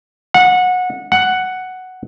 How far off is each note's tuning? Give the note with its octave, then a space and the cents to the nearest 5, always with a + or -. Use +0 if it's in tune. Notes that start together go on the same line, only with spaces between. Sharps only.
F#5 -20
F#5 +5